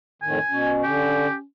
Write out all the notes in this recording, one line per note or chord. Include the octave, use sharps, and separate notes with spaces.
F2 A2 D#3 G#5
B2 C#4
D3 G4